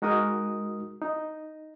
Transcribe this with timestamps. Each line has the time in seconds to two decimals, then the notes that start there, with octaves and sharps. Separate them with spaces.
0.02 G#3 D#4 F#4 A#4 D#6
1.02 D#4